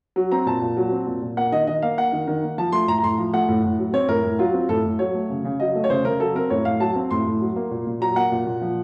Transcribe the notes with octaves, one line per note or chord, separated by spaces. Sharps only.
F#3
C4 A#5
A#2 A5
A#2
F#3
C4
A#2
A#2
A#3 F#5
D#3 D#5
D#3 D#5
A#3 F5
A#3 F#5
D#3
D#3
A#3
F3 A5
A3 C6
A2 A#5
A#5
A2 C6
F3
A3 F#5
A2
A2
F#3
C4 C#5
A2 A#4
A2
F#3 F4
C4
A2 A4
A2
F#3 C#5
A3
C#3
C#3
F#3 D#5
A3
C#5
C#3 C5
C#3 A#4
F#3 A4
C4 A#4
A2 C#5
A2 F5
F#3 A5
C4
A2 C6
A2
F#3
A#3
A#2
A#2
F#3 A#5
A#3 F#5
A#2
A#2
F3